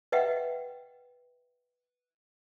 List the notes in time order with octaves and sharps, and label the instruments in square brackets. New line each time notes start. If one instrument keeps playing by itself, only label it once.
[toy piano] B4 D#5 E5 F#5 G5